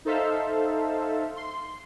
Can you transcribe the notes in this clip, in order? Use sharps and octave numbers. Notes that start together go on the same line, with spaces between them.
D#4 A4 C5 E5 F5
C6